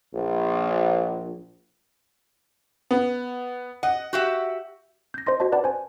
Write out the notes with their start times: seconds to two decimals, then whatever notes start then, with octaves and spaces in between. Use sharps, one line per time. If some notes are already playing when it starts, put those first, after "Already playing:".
0.13 A#1
2.91 B3
3.83 D#5 F#5
4.13 F#4 G4 E5
5.14 G6 A#6
5.26 C5 D#5 C6 A#6
5.40 F#4 C5 D#5 A5
5.52 B4 D5 F#5 A5 B5
5.64 C5 G#5